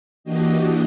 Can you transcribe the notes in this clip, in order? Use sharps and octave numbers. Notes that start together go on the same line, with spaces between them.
E3 A#3 D4 F#4 G4 D#5